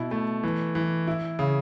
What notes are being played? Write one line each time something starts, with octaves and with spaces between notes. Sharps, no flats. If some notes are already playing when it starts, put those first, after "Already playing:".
Already playing: B2 E4
A3
E3
E3
E4
C#3